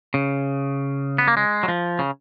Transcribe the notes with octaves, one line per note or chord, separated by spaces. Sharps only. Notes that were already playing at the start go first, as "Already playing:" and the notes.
C#3
B3
A#3
G#3
F#3
F3
C#3